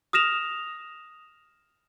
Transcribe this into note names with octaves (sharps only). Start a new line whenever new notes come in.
D#6 F6 A#6 E7 F7